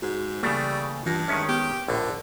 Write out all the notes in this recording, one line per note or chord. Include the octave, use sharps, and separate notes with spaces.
G#2 F#4 G#4
C#3 E3 G3 A3 A#3
G2 E3 F4 A#6
D#3 G#3 C#4 E5 C#6
B3 G4
A#1 A2 D3